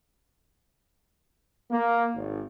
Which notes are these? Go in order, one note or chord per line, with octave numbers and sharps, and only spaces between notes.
A#3
G#1